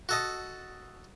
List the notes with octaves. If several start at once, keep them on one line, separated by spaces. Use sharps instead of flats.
F#4 A4 D#5